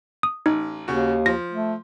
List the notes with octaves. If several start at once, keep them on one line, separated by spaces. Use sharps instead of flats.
D#6
A1 D#4
D#2 C#3 F#4
F3 A#6
A3